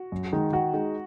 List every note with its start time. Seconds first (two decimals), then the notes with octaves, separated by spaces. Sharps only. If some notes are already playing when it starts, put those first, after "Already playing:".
Already playing: F#4
0.12 F#2
0.33 D#3 G#3 D#4
0.52 D#3 F#4
0.74 G#3 D#4